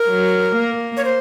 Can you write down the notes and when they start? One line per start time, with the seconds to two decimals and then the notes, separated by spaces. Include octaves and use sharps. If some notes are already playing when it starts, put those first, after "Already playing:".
Already playing: A#4
0.08 F#3
0.56 A#3
0.97 C#5
1.05 C5